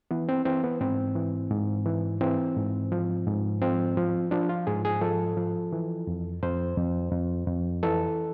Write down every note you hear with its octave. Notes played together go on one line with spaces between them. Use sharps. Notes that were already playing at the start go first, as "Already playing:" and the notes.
E3 B3
C4
E3 C4
B3
G#2 C4
E3
G#2
E3
E3 C4
G#2
F3
G#2
F3 C4
F3
F3 D4
F4
G#2 G#4
G#4
F3 A4
F3
E3
F2
F2 C5
F2
F2
F2
E3 A4